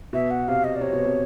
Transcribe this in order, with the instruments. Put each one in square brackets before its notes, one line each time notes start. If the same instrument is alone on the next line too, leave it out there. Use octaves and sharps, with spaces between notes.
[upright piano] B2 [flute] E5
[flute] F#5
[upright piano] C3 [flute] F5
[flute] D#5
D5
[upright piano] C3 [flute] C#5
[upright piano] B2
C3